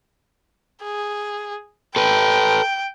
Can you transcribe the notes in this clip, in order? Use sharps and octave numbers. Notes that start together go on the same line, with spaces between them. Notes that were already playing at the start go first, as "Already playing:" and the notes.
G#4
A4 B4 G5